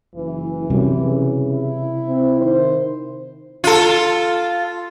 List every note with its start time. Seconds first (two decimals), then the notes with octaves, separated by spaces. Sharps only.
0.16 F#1 E3
0.70 F#2 C3 G3
1.01 C#3
1.52 E4
2.08 C4
2.41 D#3 C5
3.64 F4 A4